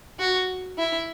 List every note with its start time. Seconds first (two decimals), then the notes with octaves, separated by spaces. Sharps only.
0.19 F#4
0.78 E4